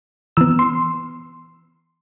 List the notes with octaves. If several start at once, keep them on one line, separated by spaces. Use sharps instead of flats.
E3 B3 E6
C6